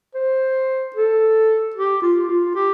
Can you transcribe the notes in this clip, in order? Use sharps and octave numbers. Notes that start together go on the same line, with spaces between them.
C5
A4
G4
F4
F4
G4